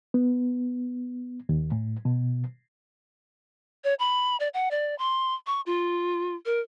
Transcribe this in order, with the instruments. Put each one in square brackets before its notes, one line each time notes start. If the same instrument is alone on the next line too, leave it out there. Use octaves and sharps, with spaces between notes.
[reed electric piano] B3
D#2
A2
B2
[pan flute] C#5
B5
D5
F#5
D5
C6
C#6
F4
A#4